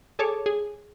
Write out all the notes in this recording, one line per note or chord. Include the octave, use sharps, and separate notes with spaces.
G#4 A4 C#5 A5 D6
G#4